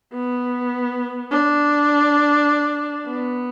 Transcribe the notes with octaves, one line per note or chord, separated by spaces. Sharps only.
B3
D4
B3